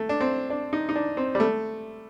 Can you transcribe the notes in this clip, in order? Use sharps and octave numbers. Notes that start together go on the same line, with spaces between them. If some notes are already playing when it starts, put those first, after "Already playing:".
Already playing: A3
D4
C4
D4
D#4
D#4
D4
C4
G3
A3